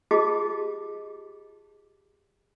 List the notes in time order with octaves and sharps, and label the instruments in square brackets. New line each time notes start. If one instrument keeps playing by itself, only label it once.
[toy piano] F4 G4 G#4 D#5 A5 D6